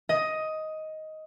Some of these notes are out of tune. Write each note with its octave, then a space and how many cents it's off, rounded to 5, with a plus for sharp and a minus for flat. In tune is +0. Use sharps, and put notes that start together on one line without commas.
D#5 +10